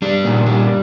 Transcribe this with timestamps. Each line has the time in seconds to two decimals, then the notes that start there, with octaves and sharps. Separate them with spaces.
0.02 G3 D4
0.24 A#2
0.46 G3